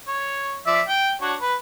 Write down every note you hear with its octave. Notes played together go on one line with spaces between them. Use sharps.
C#5
F3 D5 E5
G5
D4 F#4 C#5
B4